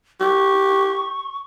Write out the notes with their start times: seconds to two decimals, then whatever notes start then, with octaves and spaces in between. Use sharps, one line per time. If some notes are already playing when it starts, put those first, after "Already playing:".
0.20 G4 C#6